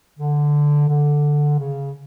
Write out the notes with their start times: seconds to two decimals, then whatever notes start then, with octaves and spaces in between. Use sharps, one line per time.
0.19 D3
0.89 D3
1.59 C#3